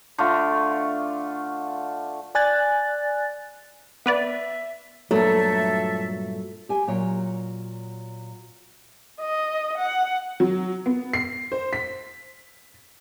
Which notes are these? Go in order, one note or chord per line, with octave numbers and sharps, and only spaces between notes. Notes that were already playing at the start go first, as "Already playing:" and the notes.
D3 A3 F4
D5 G#5 F#6 A6
B3 B4 D5 E5
G2 A#2 F#3 A3 A4 E5
G4 G#5
A#2 F#3 C#5
D#5
F#5
F#3
B3
C7
C5
B6